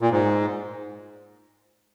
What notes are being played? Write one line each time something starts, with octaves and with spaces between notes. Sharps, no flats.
A#2
G#2